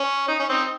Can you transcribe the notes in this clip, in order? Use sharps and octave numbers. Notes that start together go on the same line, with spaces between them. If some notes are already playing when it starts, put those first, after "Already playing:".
Already playing: C#4
D#4
C#4
C4 D#4